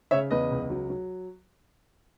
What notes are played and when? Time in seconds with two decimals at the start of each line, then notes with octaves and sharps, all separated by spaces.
0.11 C#3 C#5 E5
0.31 E2 B4 D#5
0.51 C#2
0.70 F#3
0.90 F#3